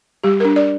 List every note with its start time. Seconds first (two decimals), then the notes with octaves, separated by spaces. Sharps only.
0.23 G3 G4
0.40 D4 A#4
0.56 D5